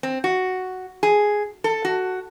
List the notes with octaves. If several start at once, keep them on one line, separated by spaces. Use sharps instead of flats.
C4
F#4
G#4
A4
F#4